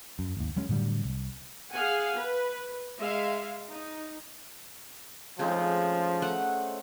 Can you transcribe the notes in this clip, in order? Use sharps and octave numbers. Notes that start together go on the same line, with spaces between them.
F#2
G#1 D#2
F#3 G#3 C#4
A2 D3 F#3 G3
C2
G#4 F5 F#5 G#5
B4
G#3 E5 F5
D#4
C#3 F3 G#3 A3 C4 D#4
A3 F#5